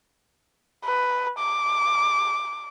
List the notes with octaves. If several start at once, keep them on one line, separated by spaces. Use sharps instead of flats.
B4
D6